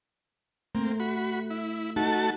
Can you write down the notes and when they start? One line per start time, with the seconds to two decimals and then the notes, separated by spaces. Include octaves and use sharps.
0.75 A3 A#3 C4
1.00 F#4 B5
1.50 E4
1.96 A3 D#4 F#4 A5